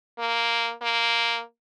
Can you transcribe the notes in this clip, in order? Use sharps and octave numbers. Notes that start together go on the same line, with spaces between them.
A#3
A#3